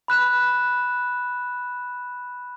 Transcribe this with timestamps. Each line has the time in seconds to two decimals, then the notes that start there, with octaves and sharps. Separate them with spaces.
0.08 B5 F#6 E7